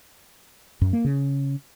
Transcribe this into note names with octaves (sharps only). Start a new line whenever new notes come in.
F#2
A#3
C#3